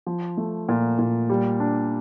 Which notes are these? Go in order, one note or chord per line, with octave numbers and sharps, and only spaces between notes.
F3
A3
A#2
A#2
G3
D4